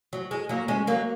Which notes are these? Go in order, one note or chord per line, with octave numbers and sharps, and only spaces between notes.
F#3
G#3
F#3 A#3
G#3 C#4
F#3 A#3